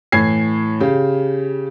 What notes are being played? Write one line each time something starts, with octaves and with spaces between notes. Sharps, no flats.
A2 E3 G#6 C7
C#3 G4